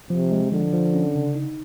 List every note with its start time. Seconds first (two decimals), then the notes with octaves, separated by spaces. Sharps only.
0.10 C3 F3
0.31 G#3
0.52 D3 F3
0.73 F3
0.94 C#4
1.15 C#3
1.35 D#4